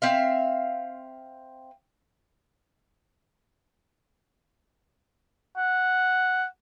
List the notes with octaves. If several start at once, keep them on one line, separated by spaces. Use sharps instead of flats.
C4 E5 F5
F#5